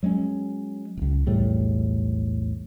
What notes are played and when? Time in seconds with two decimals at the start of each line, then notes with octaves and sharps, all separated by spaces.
0.03 F#3 G#3 B3 C#4
0.97 D#1 C#2
1.27 B1 E2 A2 G3